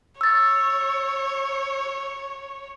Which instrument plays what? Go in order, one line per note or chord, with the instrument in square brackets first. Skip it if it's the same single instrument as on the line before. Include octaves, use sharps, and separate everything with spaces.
[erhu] C#5 [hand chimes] E6 A6